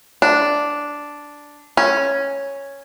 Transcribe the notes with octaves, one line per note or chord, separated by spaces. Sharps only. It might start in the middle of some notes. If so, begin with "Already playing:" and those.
D4
C#4